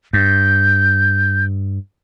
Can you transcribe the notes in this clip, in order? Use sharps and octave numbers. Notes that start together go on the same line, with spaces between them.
G2 G6